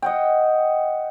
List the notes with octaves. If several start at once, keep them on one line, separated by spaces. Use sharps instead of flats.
D#5 F#5 G5